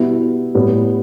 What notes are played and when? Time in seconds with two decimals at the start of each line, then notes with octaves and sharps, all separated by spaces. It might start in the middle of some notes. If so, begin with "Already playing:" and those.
Already playing: B2 G3 B3 E4
0.55 A2 G3 B3